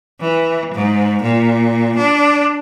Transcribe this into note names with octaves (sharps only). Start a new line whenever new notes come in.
E3
G#2
A#2
D4